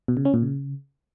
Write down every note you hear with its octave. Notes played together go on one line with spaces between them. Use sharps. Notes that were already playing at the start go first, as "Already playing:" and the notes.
B2
C#3
C#4
A#2
C#3